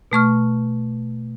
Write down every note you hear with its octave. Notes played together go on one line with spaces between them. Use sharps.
B2 A3 C#6 F6